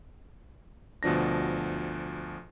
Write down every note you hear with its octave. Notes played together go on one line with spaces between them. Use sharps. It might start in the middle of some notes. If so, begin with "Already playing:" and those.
D2 B2 F3 D4 A#6